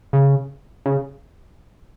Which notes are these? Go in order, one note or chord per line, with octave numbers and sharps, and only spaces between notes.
C#3
C#3